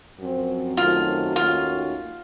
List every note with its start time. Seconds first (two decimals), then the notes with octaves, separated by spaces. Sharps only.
0.19 F#2 F3 C4
0.77 F#2 D#3 F#3 A3 C4 F4
1.36 D#2 D#3 A3 C#4 F4 F#4